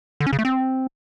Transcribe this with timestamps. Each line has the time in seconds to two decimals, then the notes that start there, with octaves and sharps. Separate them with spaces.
0.20 D3
0.27 C#4
0.33 C#3
0.39 A3
0.45 C4